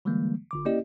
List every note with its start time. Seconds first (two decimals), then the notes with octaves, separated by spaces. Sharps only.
0.05 D3 E3 G3 G#3 A#3
0.51 G1 D3 D6
0.65 A#3 C#4 E4 G4 D5 D#5